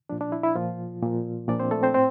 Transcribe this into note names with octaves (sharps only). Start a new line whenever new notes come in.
A#2 F3 D4
D4
E4
E4
A#2 F3 F4
A#2 F3
A#2 F3 D4 D5
C4 C5
A3 A4
C4 C5
A2 C4 C5